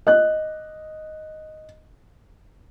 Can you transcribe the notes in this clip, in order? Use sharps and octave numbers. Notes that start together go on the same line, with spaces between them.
D#5 F#6